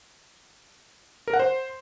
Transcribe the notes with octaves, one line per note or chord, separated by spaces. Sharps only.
A#4
F#5
C5